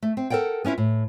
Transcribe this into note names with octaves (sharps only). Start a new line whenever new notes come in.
A3
C4
A4 A#4 D5 F#5 G5
B3 C#4 E4 F4 B4
A2